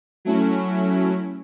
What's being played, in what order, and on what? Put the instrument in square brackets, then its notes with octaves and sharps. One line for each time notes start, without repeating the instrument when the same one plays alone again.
[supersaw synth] F#3 A3 C#4 E4